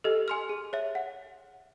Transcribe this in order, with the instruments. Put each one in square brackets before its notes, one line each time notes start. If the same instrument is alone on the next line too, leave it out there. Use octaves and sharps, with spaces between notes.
[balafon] G4 A4 [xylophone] D#5
[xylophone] G#5 C6 F6
G#4
C#5 E5
F#5